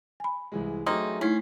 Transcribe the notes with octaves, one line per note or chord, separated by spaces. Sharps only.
G#5 B5
C2 E3 G#3
F#3 A3 A#3 C4 D#4 G#4
A3 C#4 D#4 E4 B6 C7